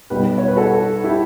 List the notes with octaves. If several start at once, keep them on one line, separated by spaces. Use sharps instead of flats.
B1 B2 G3 G4 B4
C#5
B4
F#4 A4
E4 G4